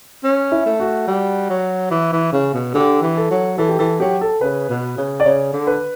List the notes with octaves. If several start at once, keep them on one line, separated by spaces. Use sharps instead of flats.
C#4
E4
A3
F#4
G3
F#3
E3
E3
C#3
B2
D3 G4
E3
A4
F#3
E3 A4
G4
E3 A4
F#3 G4
A4
C#3 B4
B2
C#3
D5
C#3 C#5
D3
B4